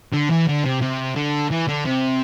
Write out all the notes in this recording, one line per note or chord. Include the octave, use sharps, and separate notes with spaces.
D3
E3
D3
C3
C3
D3
E3
D3
C3